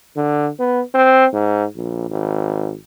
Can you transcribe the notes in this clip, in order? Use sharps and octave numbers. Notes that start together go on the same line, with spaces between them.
D3
B3
C4
G#2
A#1
G#1